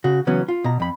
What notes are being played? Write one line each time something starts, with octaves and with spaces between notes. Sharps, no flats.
C#3 F#4
C#3 E3 F#3 B3 C#4
F4
B2 A#5
F2 B5